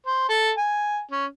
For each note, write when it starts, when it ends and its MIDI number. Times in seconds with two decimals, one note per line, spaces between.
0.07 0.25 72
0.29 0.52 69
0.58 1.01 80
1.11 1.25 61